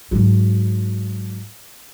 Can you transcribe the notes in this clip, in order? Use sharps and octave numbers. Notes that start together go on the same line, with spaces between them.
G#2 F#3